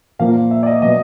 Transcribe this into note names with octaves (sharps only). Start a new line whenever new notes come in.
A#2 F3 A#3 F5
E5
D5
D#5
B2 F#3 B3 D#5